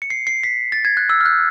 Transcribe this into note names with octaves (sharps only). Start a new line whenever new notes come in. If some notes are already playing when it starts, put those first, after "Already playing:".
C#7
C7
C7
B6
A6
G#6
F#6
E6
F6
F#6